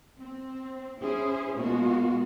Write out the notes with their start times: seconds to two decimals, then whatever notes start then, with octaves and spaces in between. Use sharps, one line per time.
0.19 C4
0.99 C#4 E4 G#4 C5
1.57 B2 G#3 A#3 F4 F#4